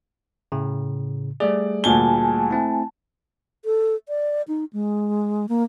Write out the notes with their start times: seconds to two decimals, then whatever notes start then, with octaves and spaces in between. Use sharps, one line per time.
0.52 A2 C#3
1.40 G3 A3 G#4 D5
1.84 D2 A#2 G#5 A5 G7
2.51 A3 C4 E4
3.65 A4
4.09 D5
4.48 D#4
4.73 G#3
5.49 A#3